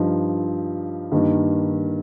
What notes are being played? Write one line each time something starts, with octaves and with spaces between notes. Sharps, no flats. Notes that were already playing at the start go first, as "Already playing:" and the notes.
Already playing: G2 F3 D#4
G2 D#3 A#3 D#4